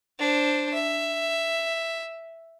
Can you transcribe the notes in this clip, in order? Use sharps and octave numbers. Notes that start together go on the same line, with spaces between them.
D4 C5
E5